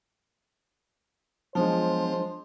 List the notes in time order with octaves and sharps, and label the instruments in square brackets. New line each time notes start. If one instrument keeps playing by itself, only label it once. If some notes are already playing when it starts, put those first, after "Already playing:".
[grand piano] F3 G#3 [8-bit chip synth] F#3 B3 D4 [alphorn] C5